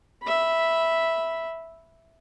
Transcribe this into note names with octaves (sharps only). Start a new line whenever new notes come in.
E5 B5